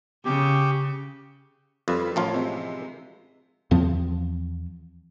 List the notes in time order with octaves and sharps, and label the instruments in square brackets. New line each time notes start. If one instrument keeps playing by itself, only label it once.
[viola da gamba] C#3 [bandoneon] G4
[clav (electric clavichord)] F2 [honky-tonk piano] G3 B4 F5
[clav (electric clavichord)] A1 F3 F4 [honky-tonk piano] A#4 C#5
[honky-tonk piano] C3 G#3 E4
[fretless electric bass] E2 F3 C4